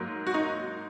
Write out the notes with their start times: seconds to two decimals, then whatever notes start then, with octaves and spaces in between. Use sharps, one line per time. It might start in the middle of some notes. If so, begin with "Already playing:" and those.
Already playing: G#2 F#3 A#3
0.27 F#4
0.34 D#4